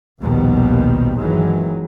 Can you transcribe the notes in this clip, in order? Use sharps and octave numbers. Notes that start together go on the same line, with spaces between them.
A#1 D#2 B2 D#3 F3 G3
G1 D#3 E3 F#3 G#3